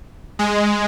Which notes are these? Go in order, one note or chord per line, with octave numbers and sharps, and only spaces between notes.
G#3